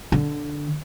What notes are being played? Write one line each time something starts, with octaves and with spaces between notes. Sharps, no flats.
D3